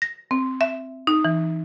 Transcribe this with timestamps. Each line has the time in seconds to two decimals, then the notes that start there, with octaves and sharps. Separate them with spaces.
0.02 A#6
0.31 C4
0.61 E5
1.07 D#4
1.25 E3